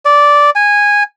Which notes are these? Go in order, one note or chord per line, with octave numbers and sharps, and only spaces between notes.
D5
G#5